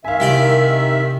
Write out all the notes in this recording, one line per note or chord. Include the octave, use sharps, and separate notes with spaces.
D#3 E5 F5 G#5
C2 G4 D5